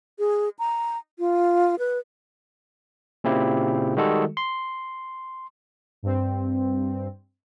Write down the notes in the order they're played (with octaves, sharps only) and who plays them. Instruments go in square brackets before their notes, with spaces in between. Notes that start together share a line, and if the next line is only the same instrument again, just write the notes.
[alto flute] G#4
A#5
F4
B4
[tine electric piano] A#2 C#3 C4 E4 G4
D#3 G3 G#3 F#4 A4
C6
[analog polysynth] G2 C4